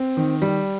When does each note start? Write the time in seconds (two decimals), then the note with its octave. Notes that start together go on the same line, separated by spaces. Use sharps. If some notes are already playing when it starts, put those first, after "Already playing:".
Already playing: C4
0.17 D#3
0.42 G3